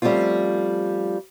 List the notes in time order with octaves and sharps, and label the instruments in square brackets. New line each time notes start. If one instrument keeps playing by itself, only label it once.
[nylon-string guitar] F3 G3 A3 C4 C#4 F4